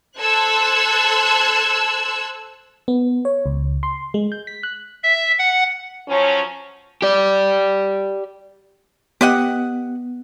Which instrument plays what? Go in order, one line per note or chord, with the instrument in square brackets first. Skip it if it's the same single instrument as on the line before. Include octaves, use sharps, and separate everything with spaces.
[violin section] A4 C5 E6 F#6 G#6
[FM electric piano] B3
C#5
C#2
C6
G#3
G6
B6
F#6
[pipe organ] E5
F#5
[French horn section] F3 F#3 C#4
[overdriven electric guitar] G4 D5
[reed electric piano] B3 [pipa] G4 D#5 F#5